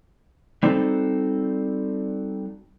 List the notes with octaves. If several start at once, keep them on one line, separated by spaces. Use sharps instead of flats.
G3 C4 D#4 F#4 A4